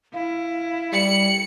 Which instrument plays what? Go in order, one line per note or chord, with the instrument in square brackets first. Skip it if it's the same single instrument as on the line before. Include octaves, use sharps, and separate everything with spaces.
[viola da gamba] E4 [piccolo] F5
[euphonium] G3 [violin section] C#7 [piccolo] F#7